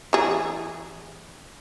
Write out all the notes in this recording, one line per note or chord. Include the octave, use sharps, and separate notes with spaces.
E3 G#4